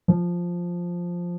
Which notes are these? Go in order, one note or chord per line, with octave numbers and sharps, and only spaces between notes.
F3